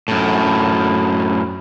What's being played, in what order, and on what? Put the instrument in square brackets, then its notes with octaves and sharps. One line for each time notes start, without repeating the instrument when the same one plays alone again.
[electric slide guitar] F#2 A2